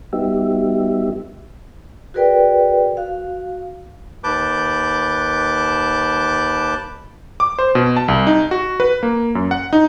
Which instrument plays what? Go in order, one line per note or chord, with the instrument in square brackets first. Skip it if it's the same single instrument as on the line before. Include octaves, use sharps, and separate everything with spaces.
[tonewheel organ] G3 B3 D#4 F#4 G4 E5
[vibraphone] F#4 G#4 A#4 B4 D5 G5
F#4 F5
[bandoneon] D#2 B4 A5 D6 G6
[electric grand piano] D6
C5
B2
A5
C2
D#4
F#4
B4
A#3
F#2
F#5
D#4